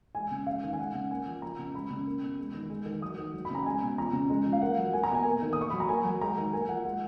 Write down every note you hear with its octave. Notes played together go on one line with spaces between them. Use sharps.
G#3 G#5
C#3
G#3 F5
D#3
G#5
G#3 F#5
C#3
A#3 G#5
F3
F3 A#5
C#3
G#3 B5
C#3
A#3
B2
G#3
D#3
G#3
D#3
F#3 D#6
D#3
F#3
B5
C#3 A#5
G#3 G#5
B2
F3 A#5
C#3
G#3
F3
F5
A#3 F#5
F#3
A#3 G#5
A#5
B2 G#5
A#3
D#3
D#6
A#3 C#6
F#3 B5
A#5
A#3 G#5
F#3
G#3 A#5
D#3
A#3 G#5
F3 F#5
G#3